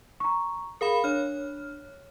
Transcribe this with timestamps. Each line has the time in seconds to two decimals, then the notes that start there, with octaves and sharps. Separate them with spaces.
0.20 A#5 C#6
0.81 G#4 A#4 F5 B5
1.04 D4 C#5 F6